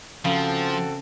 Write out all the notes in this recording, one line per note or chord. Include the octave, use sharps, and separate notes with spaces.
C#3 F3 C4 F#4 A4